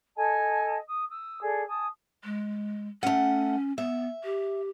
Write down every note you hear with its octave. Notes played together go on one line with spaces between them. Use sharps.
A4 D#5 G#5 A5
D#6
D#6 E6
G#4 A4 D5
G#5 A5 D#6
G#3
A3 C#4 F#5
B3 E5
G4